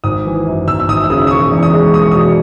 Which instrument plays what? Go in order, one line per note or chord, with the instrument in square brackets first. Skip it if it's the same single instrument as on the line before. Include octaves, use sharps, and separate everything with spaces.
[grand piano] G#1 D#6
E3
F#2
G#1 E6
E6
G#1 D#6
E6
C#3 D#6
D#6
E1 C#6
E2
D#6
G#3
E1 D#6
C#6
B2 D#6